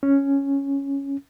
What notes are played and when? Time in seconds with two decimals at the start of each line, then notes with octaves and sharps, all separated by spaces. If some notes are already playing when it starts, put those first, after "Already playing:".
0.03 C#4